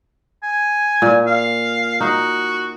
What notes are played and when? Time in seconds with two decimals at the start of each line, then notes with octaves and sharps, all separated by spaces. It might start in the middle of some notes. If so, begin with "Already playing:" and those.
0.43 G#5
1.02 A#2
1.26 F5
2.00 D#4 F#4